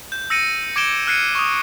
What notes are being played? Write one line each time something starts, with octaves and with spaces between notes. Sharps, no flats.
G6
E6 A#6 C#7 D#7
D6 G#6 D7 E7 G7
F6 F#6 G#6 C7 C#7 D#7
C#6 D#6